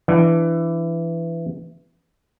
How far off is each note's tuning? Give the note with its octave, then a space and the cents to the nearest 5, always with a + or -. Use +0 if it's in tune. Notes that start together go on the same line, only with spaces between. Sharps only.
E3 +15 D4 +0